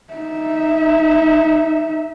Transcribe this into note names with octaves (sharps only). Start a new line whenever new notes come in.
D#4 E5